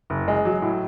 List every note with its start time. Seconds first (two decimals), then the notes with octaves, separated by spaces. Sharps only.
0.10 F#1
0.28 G#3
0.45 F#3
0.62 A2